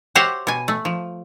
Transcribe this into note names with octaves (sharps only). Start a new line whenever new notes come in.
F#4 G4 C5 C#5 E5 F#5
B2 G#5
A3
F3